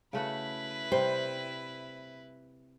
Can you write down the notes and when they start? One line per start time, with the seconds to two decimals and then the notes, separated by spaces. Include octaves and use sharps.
0.13 C#3 A3 E4 F#4 B4
0.92 C3 G3 C5